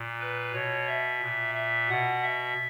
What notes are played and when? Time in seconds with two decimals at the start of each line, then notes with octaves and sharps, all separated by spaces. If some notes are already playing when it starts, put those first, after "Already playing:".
Already playing: A#2
0.20 B4
0.53 B2 C#5
0.87 E5
1.21 A#2
1.55 E5
1.89 B2 F#5
2.23 E5